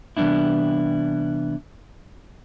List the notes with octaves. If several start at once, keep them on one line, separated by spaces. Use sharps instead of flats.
C3 E3 G3 B3 D4 E4